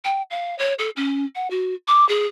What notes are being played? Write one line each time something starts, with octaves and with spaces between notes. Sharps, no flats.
G5
F5
C#5
A4
C#4
F#5
F#4
D6
G#4